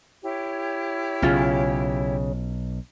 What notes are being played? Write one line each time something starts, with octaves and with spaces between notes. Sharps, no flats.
E4 G4 C#5
B1 C#3 C#4 F4 G#4